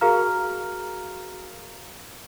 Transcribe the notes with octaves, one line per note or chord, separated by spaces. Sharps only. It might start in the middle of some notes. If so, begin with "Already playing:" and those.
F#4 G#4 A#4 F5 A#5 F6